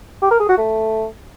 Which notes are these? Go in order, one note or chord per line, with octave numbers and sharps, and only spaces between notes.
G4
A#4
G#4
F#4
A3